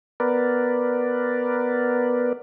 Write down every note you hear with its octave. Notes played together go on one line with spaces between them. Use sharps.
B3 A#4 B4 D5